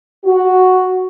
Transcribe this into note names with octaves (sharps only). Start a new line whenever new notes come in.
F#4